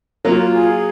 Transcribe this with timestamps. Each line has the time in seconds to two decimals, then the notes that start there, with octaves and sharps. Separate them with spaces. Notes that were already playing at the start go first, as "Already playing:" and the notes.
0.25 F#3 A#3 F4
0.53 G#4